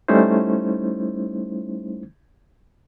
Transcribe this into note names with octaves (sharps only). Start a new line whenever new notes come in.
G3 A3 C#4 D#4 E4 C5